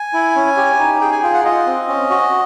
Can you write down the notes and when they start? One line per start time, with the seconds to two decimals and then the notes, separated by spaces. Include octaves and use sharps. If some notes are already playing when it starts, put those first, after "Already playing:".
Already playing: G#5
0.13 E4
0.35 C#4
0.57 G4
0.79 D#4
1.01 G#4 G5
1.12 G#5
1.22 F4 G5
1.34 F#5
1.45 F4 D#5
1.66 C4
1.88 C#4
2.10 F#4